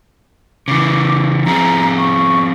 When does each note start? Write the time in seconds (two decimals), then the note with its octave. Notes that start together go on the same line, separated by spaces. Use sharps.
0.68 C#3 E3 D6
1.46 F3 C4 G#4 A#5
1.98 C#6